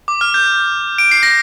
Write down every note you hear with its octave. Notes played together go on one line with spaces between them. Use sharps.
D6
F6
G6
D7
C7
A#6